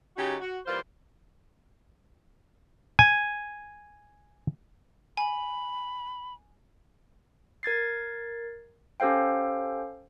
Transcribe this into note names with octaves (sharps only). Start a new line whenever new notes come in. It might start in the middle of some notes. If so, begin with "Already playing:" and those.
C#3 F#3 C#4 D#4 F#4 G4
F#4
E3 G3 A#3 F4 C5
G#5
G#5 B5
A#4 G#6 A6 C7
C#4 G4 A4 C5 F5 G5